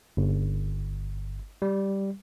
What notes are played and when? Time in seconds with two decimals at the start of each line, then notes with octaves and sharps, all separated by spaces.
0.17 G1
1.62 G3